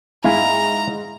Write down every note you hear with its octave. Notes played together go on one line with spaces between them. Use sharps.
G#2 E4 F5 G#5 A#5